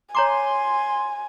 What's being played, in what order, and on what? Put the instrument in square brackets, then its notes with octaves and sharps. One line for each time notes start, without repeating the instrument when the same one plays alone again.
[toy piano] C#5 A#5 D6 [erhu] G#5 [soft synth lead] C6